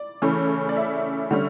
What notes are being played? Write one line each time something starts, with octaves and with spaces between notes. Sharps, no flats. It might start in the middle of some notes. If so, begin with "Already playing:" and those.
Already playing: D5
C#3 E3 A3 C#4
D5
E5
D3 G3 C#4